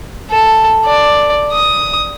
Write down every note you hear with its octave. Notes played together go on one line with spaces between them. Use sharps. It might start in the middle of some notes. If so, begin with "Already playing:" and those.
A4
D5
D#6